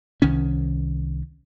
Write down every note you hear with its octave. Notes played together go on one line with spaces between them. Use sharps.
C2 D#3 C#4